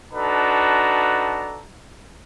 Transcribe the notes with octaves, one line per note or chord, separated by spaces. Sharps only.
D4 D#4 F#4 A4 B4 A#5